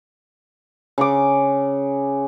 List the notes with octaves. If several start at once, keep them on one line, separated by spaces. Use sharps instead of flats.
C#3 D6